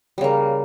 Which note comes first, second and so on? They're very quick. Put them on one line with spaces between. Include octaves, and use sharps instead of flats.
G3 C#3 A#3